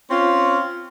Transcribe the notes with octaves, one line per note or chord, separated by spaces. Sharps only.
C4 C#4 F4